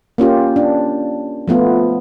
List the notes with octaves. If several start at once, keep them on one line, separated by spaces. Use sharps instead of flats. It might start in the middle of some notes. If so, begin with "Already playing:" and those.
A#3 C#4 F4 G4
D4
F3 A3 B3 F4